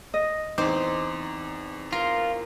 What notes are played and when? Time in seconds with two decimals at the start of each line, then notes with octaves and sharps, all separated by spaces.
0.14 D#5
0.58 E2 C4 D#4 C5 D6
1.93 F4 A#4